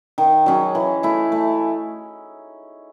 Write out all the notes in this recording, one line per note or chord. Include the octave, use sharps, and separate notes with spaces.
D#3
F#3 C#4 G#4
E3
A3 E4
A3